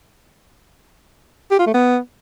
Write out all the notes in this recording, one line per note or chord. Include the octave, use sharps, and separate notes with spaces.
G4
F4
A3
B3